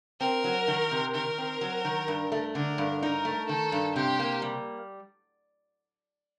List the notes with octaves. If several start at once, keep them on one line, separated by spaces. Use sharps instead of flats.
C4 A#4
F#3
D#3
C3
D#3 A#4
C4
F#3
D#3
G2
A3
D3 A#4
G2
D#4 A#4
A3
D#3 A4
G2
C3 G4
A#3
G3